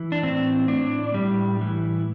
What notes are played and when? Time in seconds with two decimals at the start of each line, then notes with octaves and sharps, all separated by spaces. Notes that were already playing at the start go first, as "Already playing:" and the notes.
Already playing: E3
0.12 D4
0.22 A2 C4
0.68 A2 D4
1.14 A2 G3
1.61 E3